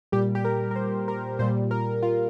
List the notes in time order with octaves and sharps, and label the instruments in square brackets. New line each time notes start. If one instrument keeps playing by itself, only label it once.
[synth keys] A#2 G3 G4
G4
A#4
A#4
C5
A#4
A#2 G3 C5
A#4
F4